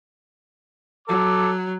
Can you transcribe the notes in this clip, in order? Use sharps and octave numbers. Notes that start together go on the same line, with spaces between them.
F#3 A4 D6